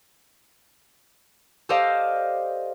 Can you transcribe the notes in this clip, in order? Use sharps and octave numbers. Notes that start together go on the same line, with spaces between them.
G4 A4 C5 D5 D#5 F5